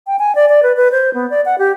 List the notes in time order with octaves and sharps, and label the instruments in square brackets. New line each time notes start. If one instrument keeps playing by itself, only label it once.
[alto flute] G5
G#5
D5
D5
B4
B4
C5
B3
D5
F#5
G4